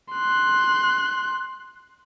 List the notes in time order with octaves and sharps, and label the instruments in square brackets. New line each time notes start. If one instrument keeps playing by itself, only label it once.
[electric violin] C6 F#6